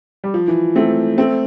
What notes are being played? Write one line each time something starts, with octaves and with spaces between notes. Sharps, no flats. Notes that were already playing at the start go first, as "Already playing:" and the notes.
G3
F3
E3
A3 C4
A3 C4